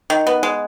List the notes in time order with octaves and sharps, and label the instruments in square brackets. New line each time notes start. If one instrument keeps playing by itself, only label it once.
[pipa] D#3
B3
G#3